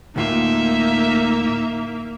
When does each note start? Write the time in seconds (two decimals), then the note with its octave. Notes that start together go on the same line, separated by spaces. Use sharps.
0.16 D2 A2 A#3 D#4 F4 E5